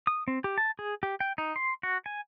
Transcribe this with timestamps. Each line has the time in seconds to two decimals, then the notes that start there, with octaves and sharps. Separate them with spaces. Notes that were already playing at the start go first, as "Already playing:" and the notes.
0.07 D#6
0.28 C4
0.44 G4
0.58 A5
0.79 G#4
1.03 G4
1.20 G5
1.38 D#4
1.56 C6
1.83 F#4
2.06 G#5